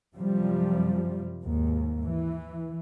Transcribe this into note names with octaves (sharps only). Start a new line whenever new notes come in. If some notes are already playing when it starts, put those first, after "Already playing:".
F#2 C3 F3 G3
D#2 G#2
E3